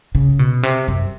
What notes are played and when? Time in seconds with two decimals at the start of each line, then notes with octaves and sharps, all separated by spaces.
0.15 C#3
0.39 B2
0.63 C3
0.88 F#2